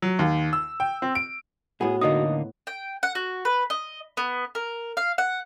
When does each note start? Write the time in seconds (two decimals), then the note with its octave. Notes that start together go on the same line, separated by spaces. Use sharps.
0.02 F#3
0.19 D#2
0.53 E6
0.80 G5
1.02 C4
1.15 D7
1.81 A2 B3 F#4 G#4
2.01 D3 A#3 D#4 D#5 D#6
2.67 G5
3.03 F#5
3.15 F#4
3.45 B4
3.70 D#5
4.17 B3
4.55 A#4
4.97 F5
5.18 F#5